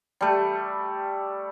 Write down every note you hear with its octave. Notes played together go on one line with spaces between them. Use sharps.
G3 A3